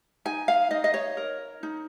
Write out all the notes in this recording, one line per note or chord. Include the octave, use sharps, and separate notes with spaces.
D#4 G#5
F5
D#4 D#5
D#5
C#5
A#4
D#4